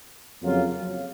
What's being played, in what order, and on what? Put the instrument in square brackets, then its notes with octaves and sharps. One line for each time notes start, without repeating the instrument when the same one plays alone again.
[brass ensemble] F2 C#3 F#3 A#3 F4